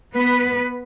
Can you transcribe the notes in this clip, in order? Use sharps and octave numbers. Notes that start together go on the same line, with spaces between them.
B3 B4